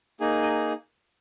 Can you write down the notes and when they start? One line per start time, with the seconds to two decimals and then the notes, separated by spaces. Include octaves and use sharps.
0.20 A#3 D#4 G#4
0.42 D#5